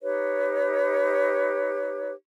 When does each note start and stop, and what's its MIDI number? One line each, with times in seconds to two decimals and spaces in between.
0.02 2.12 63
0.02 2.12 67
0.02 2.12 71
0.02 2.12 73